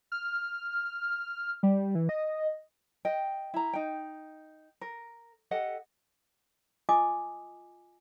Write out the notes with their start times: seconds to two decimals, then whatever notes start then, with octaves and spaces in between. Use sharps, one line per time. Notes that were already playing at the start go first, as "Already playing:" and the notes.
0.12 F6
1.63 G3
1.95 E3
2.09 D#5
3.05 D#5 G5
3.54 E4 A#5
3.73 D#4 G5
4.81 A#4
5.51 G4 A4 D#5 F#5
6.89 F4 D#5 G#5 D6 D#6